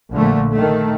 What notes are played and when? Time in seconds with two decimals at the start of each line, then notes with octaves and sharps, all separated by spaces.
0.12 A#1 A#2 D3 A3
0.52 D#3 A3